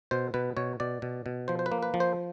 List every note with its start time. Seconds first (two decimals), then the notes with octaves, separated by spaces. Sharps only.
0.11 B2 C5
0.34 B2 B4
0.57 B2 C#5
0.80 B2 D5
1.02 B2
1.26 B2
1.48 F3 C5
1.59 C5
1.66 B4
1.72 A#3
1.83 B4
1.94 F3
2.00 C5